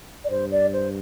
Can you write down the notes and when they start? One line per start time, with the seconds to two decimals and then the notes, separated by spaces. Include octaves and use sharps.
0.24 D5
0.30 G2 C5
0.51 D5
0.73 C5